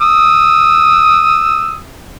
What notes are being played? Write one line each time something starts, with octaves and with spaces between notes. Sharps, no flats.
D#6 E6